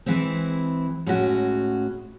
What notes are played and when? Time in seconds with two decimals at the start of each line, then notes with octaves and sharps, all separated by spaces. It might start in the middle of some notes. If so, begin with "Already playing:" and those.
0.06 E3 G#3 C4 E4
1.06 A2 G#3 C#4 F#4